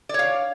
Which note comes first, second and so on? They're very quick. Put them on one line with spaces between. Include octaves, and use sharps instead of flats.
D5 C#5 F5